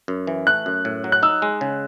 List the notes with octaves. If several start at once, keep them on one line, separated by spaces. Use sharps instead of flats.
F#2
E3
A3 F#6
F#2
A2
F#3
F#6
D#4 E6
G#3
C#3